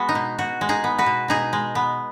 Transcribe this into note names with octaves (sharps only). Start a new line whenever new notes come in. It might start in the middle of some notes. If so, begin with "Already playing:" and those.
Already playing: G#3 B3 F#4
D#4
B2
B2 F#4
G#3
D#4 G#4
B3
F#4 B4
B2
B2 D#4 G#4
G#3
B3